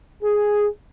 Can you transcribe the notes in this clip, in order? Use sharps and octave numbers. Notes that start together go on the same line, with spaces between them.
G#4